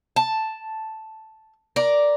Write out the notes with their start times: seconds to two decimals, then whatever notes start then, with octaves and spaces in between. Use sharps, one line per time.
0.16 A5
1.76 A#4 D5